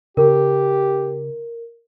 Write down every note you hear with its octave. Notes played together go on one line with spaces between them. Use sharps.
C#3 G4 A#4